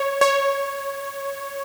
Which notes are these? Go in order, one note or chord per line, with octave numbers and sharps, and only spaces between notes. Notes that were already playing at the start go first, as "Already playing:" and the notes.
Already playing: C#5
C#5